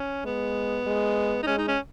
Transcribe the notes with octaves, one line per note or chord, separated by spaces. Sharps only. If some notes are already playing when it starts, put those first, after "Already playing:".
Already playing: C#4
G#3 B3
G#3
D#4
G#3 C#4
D#4
C#4